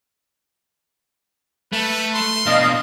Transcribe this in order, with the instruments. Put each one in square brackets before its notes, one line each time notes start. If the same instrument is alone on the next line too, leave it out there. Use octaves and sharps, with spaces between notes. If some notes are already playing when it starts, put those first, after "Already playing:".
[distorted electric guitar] A3 [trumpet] B4
[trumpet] C6
[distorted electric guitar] B2 D4 [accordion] D#5 F5